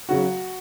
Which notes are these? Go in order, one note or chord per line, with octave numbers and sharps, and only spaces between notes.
C#3 F#3 F#4